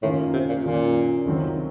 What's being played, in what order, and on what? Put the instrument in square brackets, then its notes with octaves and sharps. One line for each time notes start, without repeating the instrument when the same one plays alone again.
[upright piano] F#2 D#3 A#3 F4 [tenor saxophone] A2
[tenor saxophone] C3
A#2
[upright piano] F#2 D#3 A#3 F4 [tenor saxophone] A#2
[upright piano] C#2 C3 D#3 F#3 C4